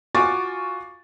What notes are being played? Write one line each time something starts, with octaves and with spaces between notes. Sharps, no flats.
F4 F#4 G#5 C#6 D6 A6